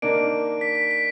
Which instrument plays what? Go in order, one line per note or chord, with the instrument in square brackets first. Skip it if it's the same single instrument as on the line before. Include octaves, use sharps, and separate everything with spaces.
[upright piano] D#3 A#3 D4 [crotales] D7
[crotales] B6
B6
B6